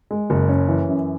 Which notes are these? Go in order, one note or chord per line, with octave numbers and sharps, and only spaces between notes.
G#3
F#1
C#4
E3
F#2